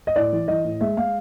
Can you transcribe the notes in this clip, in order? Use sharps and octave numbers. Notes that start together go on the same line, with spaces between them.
D#5
A2 D5
E3
E3 D#5
A2
G#3 E5
G#3 F5